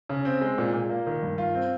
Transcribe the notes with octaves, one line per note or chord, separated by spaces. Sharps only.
C#3
C4
G#3
A#2
A#2
A#3
D#3
G2
F4
C4